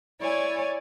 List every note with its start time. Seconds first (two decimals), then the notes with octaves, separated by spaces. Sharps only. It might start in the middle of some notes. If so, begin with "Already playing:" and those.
0.20 E4 C#5 D5 G#5